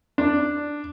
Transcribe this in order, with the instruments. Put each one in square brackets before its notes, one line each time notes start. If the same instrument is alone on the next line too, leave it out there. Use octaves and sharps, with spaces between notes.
[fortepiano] D4